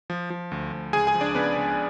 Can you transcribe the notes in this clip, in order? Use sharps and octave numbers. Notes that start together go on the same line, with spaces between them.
F3
F3
D2
D2
C#2 G#4 G#5
G#4 G#5
F3
D4 D5
C#3 B3 B4
C#2